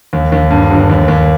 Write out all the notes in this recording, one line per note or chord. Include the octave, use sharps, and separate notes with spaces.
D#2
D#2
G2
G1
D#2
D#2